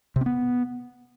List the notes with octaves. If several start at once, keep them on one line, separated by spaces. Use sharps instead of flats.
C3
C4
B3